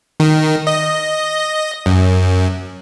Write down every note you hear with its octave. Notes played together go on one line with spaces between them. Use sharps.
D#3
D#5
F#2